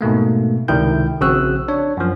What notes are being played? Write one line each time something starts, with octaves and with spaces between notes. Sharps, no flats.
G#2 B2 A3 A#3
C#2 C3 D#3 E4 G5 G6
A#1 C#3 C4 F#4 E6 F#6
D4 C#5
F#2 F3